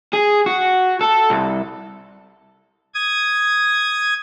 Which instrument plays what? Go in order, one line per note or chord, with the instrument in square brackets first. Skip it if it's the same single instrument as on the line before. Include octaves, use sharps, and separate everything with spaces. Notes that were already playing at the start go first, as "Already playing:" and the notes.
[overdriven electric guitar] G#4
F#4
A4
C2
[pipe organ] D#6 G#6